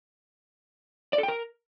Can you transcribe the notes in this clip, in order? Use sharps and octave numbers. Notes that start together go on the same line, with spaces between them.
D5
A4
G5
A#4